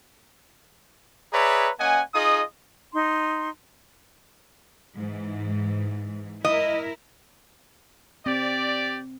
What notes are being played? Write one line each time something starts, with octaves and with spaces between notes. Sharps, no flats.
G#4 B4 C#5 D5 E5 A#5
A#3 C#4 D#5 F#5 G#5
D#4 F4 G#4 D#5 D#6
D#4 C6
G#2 E3
E4 A#4 D#5
C4 G4 D5